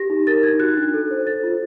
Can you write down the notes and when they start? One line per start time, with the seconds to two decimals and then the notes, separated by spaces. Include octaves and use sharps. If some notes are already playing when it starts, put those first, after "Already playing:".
Already playing: G4 A#6
0.10 D#4
0.27 A#4 A6
0.43 D#4 G#6
0.60 F#4 F#6
0.77 D4
0.94 A4
1.11 C5
1.27 A4 A6
1.44 F4